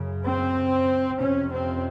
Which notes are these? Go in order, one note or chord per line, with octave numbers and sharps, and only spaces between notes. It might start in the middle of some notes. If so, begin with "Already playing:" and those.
Already playing: F#2 C#3
C4
F2 C3 C#4
C4